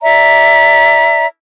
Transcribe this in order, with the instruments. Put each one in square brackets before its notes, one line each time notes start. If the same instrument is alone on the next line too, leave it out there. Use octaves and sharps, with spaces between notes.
[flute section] D5 E5 A#5